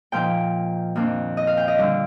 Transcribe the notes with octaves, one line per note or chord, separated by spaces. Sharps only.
A#2 F3 A#3 D#4 G5
F2 D#3 A#3 D4
D#5
F5
G5
D#5
D3 G3 D4